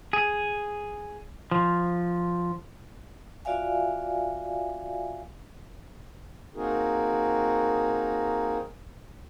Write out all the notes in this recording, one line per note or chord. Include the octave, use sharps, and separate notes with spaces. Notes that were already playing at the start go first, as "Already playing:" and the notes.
G#4
F3
F4 F#4 D5 E5 F5 G#5
A#3 C4 D#4 F#4 G#4 A#4